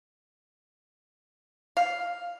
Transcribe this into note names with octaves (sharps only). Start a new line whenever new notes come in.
F5